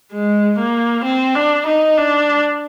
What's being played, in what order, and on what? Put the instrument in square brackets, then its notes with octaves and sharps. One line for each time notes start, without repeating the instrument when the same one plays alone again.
[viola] G#3
A#3
C4
D4
D#4
D4